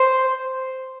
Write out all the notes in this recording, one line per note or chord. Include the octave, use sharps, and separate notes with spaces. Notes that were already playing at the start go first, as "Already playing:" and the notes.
Already playing: C5